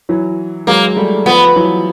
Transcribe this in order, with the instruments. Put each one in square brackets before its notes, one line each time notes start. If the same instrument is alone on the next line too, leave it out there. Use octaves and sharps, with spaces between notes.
[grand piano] E3 F#3
[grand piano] F#3 G#3 [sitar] A#3
[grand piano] G3 A3
[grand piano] F3 [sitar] B3
[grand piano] E3 F#3